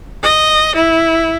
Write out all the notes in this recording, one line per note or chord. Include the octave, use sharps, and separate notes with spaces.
D#5
E4